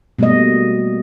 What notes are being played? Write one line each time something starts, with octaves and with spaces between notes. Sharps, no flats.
B2 G3 A3 A#3 D#5